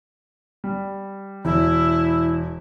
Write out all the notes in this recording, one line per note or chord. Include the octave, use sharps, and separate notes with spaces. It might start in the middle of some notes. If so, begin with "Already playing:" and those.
G3
E1 E4